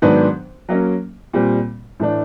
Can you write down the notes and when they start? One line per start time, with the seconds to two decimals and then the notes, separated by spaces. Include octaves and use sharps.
0.02 G#2 D#3 F#3 B3 D4
0.69 F#3 A#3 C#4
1.34 A#2 G3 C4
2.00 A2 E3 A3 D4